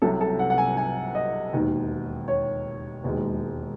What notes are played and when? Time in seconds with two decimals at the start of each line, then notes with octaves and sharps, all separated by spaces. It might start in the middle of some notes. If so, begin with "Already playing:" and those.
0.02 C2 C3 F#3 A4
0.21 A4
0.39 F#5
0.50 F#5
0.58 G#5
0.77 G#5
1.15 D#5
1.53 E1 D#2 D#3
2.28 C#5
3.03 E1 D#2 D#3 G#3